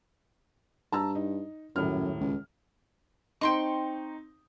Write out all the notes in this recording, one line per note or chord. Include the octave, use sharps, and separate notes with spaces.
G2 A5 A#5 E6
D#4
D#1 F#2 A2 F6
C#2
C4 D#4 G5 C6 C#6